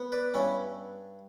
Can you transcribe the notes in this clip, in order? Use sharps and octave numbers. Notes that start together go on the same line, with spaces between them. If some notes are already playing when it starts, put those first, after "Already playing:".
Already playing: B3
B4 D5
G2 C#4 E4